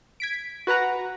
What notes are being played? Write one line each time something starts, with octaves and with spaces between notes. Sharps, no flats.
G#6 B6 D7
F#4 B4 F#5 A#5